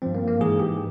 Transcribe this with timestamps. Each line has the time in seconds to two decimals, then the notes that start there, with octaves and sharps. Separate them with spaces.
0.02 G2 F3 C4
0.15 A#3
0.28 A#3
0.40 G#2 E3 G#4
0.60 G4